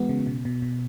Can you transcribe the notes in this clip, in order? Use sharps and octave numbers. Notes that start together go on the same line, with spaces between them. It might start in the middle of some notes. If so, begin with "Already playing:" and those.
Already playing: E3 G#3 B3 F#4
C#3
B2
B2
B2